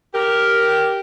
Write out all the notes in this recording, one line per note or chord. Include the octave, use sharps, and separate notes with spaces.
G4 A#4